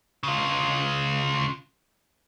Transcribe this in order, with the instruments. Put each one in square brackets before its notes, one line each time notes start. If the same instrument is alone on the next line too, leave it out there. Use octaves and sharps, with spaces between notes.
[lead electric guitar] C#3 F4